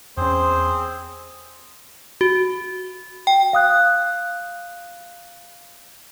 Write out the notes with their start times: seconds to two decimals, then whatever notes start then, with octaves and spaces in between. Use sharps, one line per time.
0.17 E2 C4 C#4 G#4 C5
2.21 F#4
3.27 G5
3.53 F5 D#6 F#6